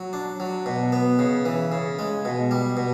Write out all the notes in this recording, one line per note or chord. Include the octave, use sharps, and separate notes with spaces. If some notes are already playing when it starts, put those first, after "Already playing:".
Already playing: F#3
D4
F#3
B2
B3
C#3
E3
C#3
G#3
B2
G3
B2